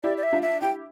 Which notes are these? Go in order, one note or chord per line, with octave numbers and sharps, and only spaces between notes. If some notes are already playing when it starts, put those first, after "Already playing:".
E4 G4 D5
D5
E5
D4 F4
E5
E4 G4 G5